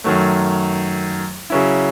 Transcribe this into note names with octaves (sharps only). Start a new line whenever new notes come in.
F#2 D#3 F#3 A3
C#3 F#3 C#4 E4